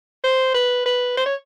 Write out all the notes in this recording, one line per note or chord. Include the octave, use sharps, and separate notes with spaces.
C5
B4
B4
C5
C#5